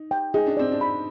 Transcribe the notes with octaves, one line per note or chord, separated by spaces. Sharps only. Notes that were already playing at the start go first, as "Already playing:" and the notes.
Already playing: D#4
G5
D#4 G#4
D4
C4 D5
D4
B5